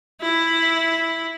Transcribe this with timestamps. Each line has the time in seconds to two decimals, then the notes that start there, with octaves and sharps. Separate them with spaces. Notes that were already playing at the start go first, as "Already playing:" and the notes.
0.21 E4